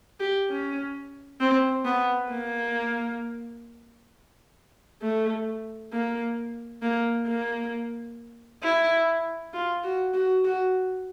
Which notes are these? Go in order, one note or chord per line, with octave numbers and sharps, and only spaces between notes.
G4
C#4
C4
B3
A#3
A3
A#3
A#3
A#3
E4
F4
F#4
F#4
F#4